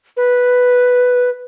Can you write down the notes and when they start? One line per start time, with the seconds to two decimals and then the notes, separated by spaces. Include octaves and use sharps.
0.17 B4